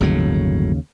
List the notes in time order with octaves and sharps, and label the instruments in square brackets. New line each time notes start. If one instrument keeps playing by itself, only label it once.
[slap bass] G1 A2 F#3 [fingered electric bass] D#2 C#3